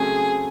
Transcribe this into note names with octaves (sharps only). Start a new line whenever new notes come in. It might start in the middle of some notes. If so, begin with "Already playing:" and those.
Already playing: C#3 F#3 A3 C4 G#4